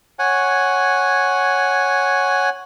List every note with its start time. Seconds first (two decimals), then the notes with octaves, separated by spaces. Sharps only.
0.19 C#5 F#5 G#5